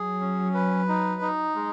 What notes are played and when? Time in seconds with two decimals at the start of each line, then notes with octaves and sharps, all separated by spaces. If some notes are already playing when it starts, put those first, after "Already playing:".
Already playing: F#3 G#4
0.21 C#4
0.54 B4
0.88 D#4
1.21 D#4
1.55 G#3